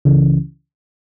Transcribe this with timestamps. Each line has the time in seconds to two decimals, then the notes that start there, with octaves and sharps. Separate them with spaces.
0.05 C#2 C#3 E3